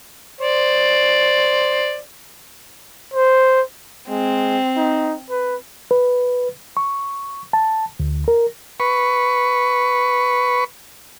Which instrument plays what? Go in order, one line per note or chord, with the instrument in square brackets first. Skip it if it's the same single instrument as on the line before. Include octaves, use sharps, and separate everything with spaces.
[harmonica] C5 D5
[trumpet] C5
[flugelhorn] G#3 [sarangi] C4
[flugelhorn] D#4
B4
[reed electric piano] B4
C#6
A5
D2
A#4
[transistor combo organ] B4 C#6